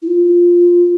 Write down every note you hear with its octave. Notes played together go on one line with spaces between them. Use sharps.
E4
F4